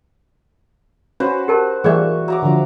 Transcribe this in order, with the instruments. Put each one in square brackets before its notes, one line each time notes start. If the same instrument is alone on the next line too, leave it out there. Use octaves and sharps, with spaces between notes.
[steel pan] C#4 [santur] F#4 B4 C5
[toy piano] G4 A#4 A5
[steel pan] E3 G3 A#3 [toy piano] G#4 D5 [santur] E5 C#6
[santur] F#3 A#5 D6
[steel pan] D3 F3